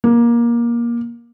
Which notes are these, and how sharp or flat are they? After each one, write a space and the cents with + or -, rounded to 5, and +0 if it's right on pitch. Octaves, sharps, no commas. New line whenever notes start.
A#3 +20